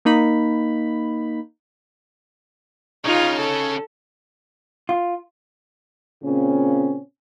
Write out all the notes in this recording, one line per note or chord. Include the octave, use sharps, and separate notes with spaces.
A#3 D#4 B5
C#3 C#4 D#4 F4
A4
F4
A#2 C#3 C4 C#4